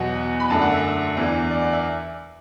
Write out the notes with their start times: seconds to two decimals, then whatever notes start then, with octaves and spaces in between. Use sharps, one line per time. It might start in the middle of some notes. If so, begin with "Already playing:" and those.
Already playing: E2 B2 F#3 F#5
0.40 B5
0.50 F#2 D3 A3 D4 A5
0.62 F#5
0.72 E5
1.17 E2 E3 D4
1.51 D5
1.62 D5
1.73 E5